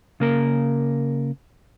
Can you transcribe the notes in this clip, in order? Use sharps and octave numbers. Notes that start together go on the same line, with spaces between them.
C#3 A#3 A#4